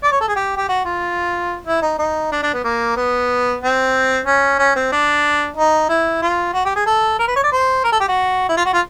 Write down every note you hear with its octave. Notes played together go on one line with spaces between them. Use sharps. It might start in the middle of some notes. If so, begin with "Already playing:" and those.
D5
C#5
A4
G#4
G4
G4
F#4
F4
E4
D#4
D#4
D4
D4
B3
A#3
B3
C4
C#4
C#4
C4
D4
D#4
E4
F4
F#4
G4
G#4
A4
A#4
B4
C#5
D5
C5
A#4
A4
G4
F#4
E4
F4
F#4
F4